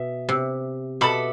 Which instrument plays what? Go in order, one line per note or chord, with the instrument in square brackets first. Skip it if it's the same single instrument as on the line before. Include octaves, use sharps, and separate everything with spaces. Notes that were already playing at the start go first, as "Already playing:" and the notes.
Already playing: [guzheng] B2 [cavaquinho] E5
[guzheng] C3
[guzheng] B2 [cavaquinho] A4 E5 B5 D6